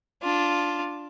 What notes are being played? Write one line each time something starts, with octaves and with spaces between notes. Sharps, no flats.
D4 F4